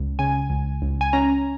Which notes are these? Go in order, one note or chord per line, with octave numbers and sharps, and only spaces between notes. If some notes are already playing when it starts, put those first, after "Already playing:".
Already playing: C#2
C#3 G#5
C#2
C#2
G#5
C#4 A#5